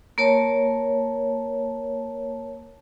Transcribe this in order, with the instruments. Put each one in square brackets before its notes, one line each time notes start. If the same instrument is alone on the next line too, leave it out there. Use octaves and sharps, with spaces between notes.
[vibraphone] A#3 A#4 C#5 A5